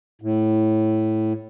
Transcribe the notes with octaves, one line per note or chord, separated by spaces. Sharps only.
A2